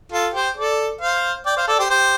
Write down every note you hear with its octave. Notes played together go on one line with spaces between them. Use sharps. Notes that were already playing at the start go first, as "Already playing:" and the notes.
F4 A4
G4 C5
A4 D5
C5 F5
D5 G5
C5 F5
A4 D5
G4 C5
G4 C5